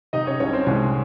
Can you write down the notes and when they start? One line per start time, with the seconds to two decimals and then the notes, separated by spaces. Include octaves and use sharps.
0.13 C3 D#4 D#5
0.27 C#4 C#5
0.40 C2 C#4 C#5
0.53 C4 C5
0.66 C2 G#3 G#4